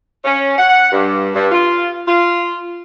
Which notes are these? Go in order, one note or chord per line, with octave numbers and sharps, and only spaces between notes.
C#4
F#5
G2
G2
F4
F4